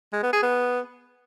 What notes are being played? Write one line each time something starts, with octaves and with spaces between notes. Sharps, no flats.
G#3
B3
G#4
B3